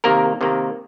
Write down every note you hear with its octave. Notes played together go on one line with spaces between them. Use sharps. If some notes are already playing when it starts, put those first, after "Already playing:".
C3 D#3 A#3 A#4
C3 D#3 A#3